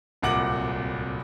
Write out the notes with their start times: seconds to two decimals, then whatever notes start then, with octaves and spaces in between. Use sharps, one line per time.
0.22 D1 C2 A#2 F#5 D6 F#7